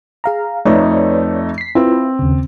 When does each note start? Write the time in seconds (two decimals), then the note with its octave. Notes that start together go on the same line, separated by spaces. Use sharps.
0.24 G#4 F5 A#5
0.65 F2 A3 D#4 B4 C#5 D5
1.58 B6 C7
1.75 C4 E4 F4 B4
2.19 D#2 C#3